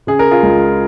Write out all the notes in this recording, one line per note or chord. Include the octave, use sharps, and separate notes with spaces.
C#3 G#4
A#4
F4 G#4
C#2